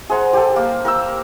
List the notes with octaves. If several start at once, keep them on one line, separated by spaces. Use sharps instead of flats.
G#4 C5 F#5 A#5
G4 A4
A#3
A#4 G5 E6